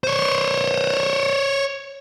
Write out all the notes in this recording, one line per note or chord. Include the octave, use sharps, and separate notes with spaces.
C5 C#5